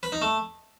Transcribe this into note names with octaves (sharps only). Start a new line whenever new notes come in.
B4
D#4
A3